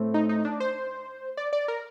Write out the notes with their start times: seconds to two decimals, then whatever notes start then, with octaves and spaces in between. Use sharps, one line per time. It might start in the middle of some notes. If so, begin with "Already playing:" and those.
Already playing: A2 A3 C4
0.14 D#4
0.29 D#4
0.45 D4
0.60 C5
1.37 D5
1.53 D5
1.68 A#4